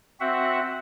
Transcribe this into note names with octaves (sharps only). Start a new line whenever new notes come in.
C4 F#4 E5 F#5